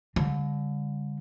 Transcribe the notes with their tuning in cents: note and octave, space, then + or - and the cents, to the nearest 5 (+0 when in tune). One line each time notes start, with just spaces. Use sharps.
D3 -35 G3 +45